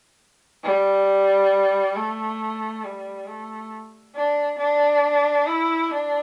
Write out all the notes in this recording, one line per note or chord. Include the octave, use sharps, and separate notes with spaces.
G3
A3
G3
A3
D4
D4
E4
D4